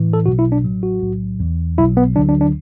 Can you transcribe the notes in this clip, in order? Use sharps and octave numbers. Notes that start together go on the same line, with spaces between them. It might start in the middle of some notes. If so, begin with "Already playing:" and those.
Already playing: A2 E3
A4
B1 B2 F#3 F#4
E4
D4
A1 A2 F#3
F#4
B1 A2 F#3
E2 E3
B1 B2 F#3 E4
B3
D2 D3 F#3 D4
D4
D4